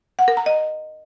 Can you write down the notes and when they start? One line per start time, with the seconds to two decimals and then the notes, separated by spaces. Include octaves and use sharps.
0.19 F#5
0.28 A#4
0.37 A#5
0.46 D#5